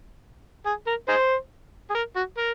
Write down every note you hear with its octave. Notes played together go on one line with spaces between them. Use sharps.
G#4
A#4
D#4 G#4 C5
G#4
A#4
F#4
A#4